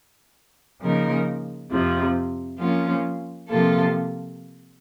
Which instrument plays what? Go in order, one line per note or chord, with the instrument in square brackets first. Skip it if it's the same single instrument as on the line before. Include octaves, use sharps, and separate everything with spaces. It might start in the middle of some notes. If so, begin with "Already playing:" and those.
[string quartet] C#3 F3 A#3 D#4 A#4
F2 C3 F3
F3 A#3 C#4 F4
C3 F3 A#3 F4 A4